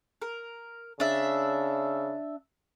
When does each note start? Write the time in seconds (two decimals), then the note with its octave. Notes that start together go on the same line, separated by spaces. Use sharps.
0.22 A#4
1.00 C#3 D4 E5